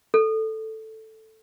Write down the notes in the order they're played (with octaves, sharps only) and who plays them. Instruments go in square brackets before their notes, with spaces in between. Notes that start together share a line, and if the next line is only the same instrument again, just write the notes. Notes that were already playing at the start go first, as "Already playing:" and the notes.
[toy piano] A4